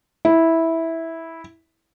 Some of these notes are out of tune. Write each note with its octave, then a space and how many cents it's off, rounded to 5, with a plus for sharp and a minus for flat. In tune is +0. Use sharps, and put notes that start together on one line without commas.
E4 -10